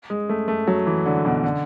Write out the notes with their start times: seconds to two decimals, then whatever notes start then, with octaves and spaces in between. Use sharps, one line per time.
0.10 G#3
0.29 A3
0.48 A3
0.67 F#3
0.87 E3
1.06 D3
1.25 B2
1.44 D3